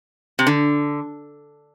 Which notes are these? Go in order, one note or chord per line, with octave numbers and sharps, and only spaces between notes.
C3
D3